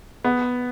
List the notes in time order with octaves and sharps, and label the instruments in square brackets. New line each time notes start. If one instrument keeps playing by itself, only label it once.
[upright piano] B3